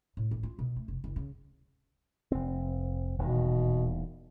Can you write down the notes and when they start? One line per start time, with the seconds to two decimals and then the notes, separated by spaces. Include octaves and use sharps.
0.17 A2
0.31 A1
0.43 F4
0.59 B2
0.76 A3
0.88 F1
1.04 F#1
1.16 C#3
2.32 F1 C4
3.19 D#1 E2 B2 D#3